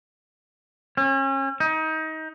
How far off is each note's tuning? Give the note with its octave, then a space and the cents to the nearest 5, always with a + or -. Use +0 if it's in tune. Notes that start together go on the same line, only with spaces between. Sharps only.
C#4 -35
D#4 +25